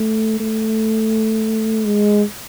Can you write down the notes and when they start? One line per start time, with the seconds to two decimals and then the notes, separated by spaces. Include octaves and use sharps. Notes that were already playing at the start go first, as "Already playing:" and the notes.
Already playing: A3
0.40 A3
1.85 G#3